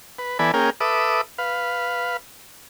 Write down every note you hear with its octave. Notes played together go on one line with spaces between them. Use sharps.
B4
E3 B3 A4 D5 G#5 B5
A#3 C#4 G#4 A#4 G5
A4 B4 E5 D6 D#6
B4 F5